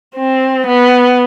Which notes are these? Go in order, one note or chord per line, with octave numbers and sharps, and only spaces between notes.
C4
B3